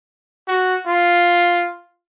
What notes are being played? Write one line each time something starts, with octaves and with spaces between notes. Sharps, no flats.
F#4
F4